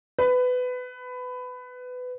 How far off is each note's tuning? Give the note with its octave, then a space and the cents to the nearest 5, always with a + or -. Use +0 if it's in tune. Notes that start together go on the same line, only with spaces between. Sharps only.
B4 +20